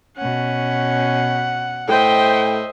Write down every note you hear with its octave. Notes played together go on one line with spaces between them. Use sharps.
B2 C#4 F#5
A2 C5 D#5 E5 G5